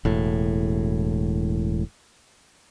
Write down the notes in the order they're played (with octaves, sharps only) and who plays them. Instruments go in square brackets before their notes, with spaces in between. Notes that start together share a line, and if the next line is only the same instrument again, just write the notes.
[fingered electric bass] E1 A2